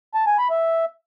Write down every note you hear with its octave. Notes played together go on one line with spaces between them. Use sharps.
A5
G#5
B5
E5